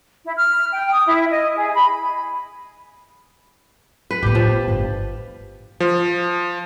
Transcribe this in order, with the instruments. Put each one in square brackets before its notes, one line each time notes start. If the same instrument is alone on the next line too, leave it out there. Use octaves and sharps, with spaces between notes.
[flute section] E4
F6
G5
D#6
E4
D#5
G#4
B5
[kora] B4
[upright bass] A2 B3 [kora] G4 B4
[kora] F3
[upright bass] G1
[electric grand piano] F3